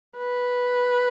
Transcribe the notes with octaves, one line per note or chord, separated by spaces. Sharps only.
B4